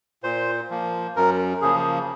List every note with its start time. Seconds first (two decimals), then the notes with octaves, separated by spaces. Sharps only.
0.23 A#2 C5
0.70 F3 A#3
1.16 F#2 A#4
1.61 C#3 F3 A#3 G#4